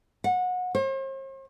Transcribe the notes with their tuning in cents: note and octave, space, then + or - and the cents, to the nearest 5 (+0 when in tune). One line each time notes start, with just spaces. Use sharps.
F#5 -25
C5 +45